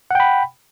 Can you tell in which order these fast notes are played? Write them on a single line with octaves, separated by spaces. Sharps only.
F#5 G5 B5